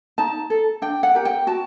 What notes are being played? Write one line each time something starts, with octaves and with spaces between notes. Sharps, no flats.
D#4 A5
A4
D4 G5
F#5
G4 A#4
G5
F#4 A5